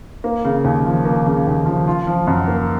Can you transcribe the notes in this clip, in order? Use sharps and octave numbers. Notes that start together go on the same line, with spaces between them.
A#3
C#3
D#2
F3
A#3
C#3
D#2
F3
F4
F3
F#2
A#3